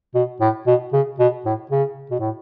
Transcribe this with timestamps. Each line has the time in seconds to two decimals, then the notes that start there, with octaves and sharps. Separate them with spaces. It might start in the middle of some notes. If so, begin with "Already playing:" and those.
0.15 B2
0.41 A2
0.67 B2
0.93 C#3
1.19 B2
1.45 A2
1.71 C#3
2.11 B2
2.20 A2